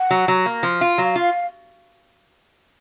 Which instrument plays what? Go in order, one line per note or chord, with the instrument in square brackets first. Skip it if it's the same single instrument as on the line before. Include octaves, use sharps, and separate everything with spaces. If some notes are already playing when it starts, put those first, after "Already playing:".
Already playing: [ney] F#5
[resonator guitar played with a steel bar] F#3
F#3
A#3
F3
F4
[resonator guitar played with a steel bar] F#3 [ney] F5
[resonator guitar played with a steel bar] F4